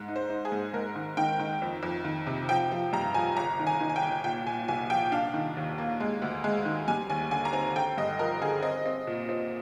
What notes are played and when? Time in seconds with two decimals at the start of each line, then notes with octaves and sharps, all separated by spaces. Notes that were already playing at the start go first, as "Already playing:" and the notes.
Already playing: G#2
0.08 D#4
0.16 C5
0.30 D#4
0.45 G#4
0.52 G#2
0.74 G#2 A#4
0.95 D#3
1.17 D#3 G5
1.39 D#3
1.62 F2
1.83 F2
2.05 D#3
2.27 C3
2.49 F3 G5
2.72 F3
2.93 G2 A#5
3.14 F3 G#5
3.37 G1 A#5
3.59 D#3
3.67 G#5
3.80 D#3
3.89 G#5
3.96 G5
4.02 G1
4.24 A#2 G5
4.46 A#2 G#5
4.68 C2 G#5
4.90 F3 G5
5.12 D4 F5
5.34 D#3
5.57 D#2
5.78 A#3
6.00 G#3
6.22 D2
6.44 G#3
6.65 D#3
6.88 G3 G#5
7.10 D#2 G#5
7.31 D3 G#5
7.45 A#5
7.53 C4 G#5
7.75 D3 G5
7.98 G2 D#5
8.19 F3 A#4
8.41 D3 G#4
8.62 C4 D#5
8.86 C4
9.07 A#2
9.29 C4